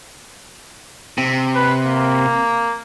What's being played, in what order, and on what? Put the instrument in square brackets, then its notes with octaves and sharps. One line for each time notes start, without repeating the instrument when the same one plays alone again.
[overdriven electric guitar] C3
[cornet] B4
A#3